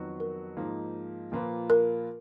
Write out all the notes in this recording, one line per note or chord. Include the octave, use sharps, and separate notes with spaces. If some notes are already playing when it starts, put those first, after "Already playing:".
Already playing: F2 D#3 F#3 B3 F#4
A#4
G#2 F3 A#3 D#4
A#2 F3 A#3 F4 B4
A#4